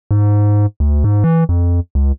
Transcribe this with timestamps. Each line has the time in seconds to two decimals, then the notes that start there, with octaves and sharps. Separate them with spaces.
0.11 G#2
0.80 D2
1.04 G#2
1.24 E3
1.49 F2
1.95 C#2